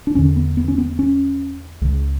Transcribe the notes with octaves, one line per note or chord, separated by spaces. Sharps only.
D4
E2 D3 C#4
B3
B3
C#4
B3
C#4
C#2 C#3